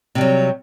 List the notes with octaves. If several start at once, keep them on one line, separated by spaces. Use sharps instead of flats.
C3 F#3 G3